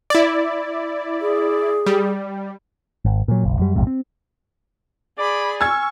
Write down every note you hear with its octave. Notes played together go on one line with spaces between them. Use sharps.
E4 D5
G#4
G3
G#1
A#2 F#3
F#1 B1
F#2 G3
A#1 F2 G#2 C3
C4
G#4 D5 B5
G#5 C#6 E6 F6 G#6